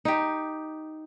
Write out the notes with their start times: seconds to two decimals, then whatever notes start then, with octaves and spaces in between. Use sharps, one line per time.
0.05 D#4 G4